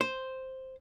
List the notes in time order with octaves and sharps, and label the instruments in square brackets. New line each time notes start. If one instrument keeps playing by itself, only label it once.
[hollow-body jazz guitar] C5